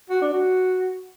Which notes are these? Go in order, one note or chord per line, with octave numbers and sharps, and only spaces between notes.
F#4
D4
F#4